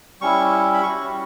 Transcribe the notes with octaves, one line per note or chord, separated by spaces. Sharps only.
G3 C#4 E4 C#6
B5
G3 C#4 F#4 C#6